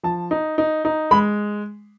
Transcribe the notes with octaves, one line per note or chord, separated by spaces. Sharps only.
F3 A5
D#4
D#4
D#4
G#3 B5